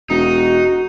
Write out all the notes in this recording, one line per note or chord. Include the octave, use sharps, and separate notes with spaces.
E1 D#4 F#4